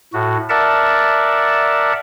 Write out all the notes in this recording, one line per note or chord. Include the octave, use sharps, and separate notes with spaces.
A2 F#4
A#4 D5 E5 F#5 A5